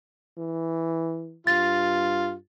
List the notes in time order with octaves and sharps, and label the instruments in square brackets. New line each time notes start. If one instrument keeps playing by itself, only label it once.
[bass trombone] E3
[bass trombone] G2 [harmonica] F4 [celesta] A6